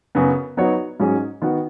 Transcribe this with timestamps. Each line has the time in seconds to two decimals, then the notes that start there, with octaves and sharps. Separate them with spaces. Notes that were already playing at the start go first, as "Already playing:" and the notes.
0.15 F#2 C#3 B3
0.57 F#3 B3 D#4 F#4 C#5
1.00 G#2 F#3 C#4 G#4
1.42 D#3 B3 F#4